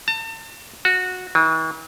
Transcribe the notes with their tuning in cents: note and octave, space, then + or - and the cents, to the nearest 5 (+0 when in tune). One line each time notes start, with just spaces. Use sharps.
A5 +35
F#4 -15
E3 -45